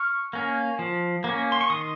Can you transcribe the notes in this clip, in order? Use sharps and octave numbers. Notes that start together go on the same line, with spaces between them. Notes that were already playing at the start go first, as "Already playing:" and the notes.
Already playing: C#6 F6
A#3 C#4
F3
A#3 C#4
C6
C#6
D#3 C6 D#6